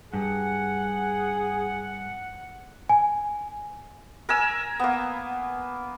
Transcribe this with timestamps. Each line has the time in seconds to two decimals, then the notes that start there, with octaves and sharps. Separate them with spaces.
0.14 G2 G#4 F#5
2.89 G#5
4.29 A#4 G#5 E6
4.79 A#3 B3